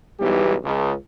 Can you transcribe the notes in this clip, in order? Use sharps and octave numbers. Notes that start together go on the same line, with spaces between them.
B1 G#2 E3 G3 B3 G4
C#2